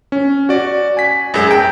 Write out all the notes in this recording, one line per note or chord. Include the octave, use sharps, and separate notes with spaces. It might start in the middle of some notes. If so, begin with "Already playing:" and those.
C#4
F#4 D5
G#5 B6
F#2 G#3
G5